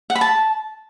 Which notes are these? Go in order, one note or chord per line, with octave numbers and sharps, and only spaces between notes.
F#5
B5
A5